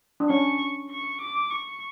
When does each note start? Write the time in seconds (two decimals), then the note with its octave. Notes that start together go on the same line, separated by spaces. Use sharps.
0.20 D4
0.29 C#4 C#6
0.90 C#6
1.20 D6
1.51 C#6